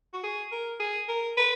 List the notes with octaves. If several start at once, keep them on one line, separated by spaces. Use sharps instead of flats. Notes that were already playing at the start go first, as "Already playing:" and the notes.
F#4
G#4
A#4
G#4
A#4
B4